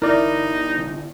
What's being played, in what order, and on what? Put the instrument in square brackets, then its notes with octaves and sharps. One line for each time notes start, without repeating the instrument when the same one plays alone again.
[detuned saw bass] G1 [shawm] D#4 [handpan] E4 [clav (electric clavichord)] A#4 D5